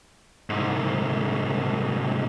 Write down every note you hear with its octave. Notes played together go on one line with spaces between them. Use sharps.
C2 G#2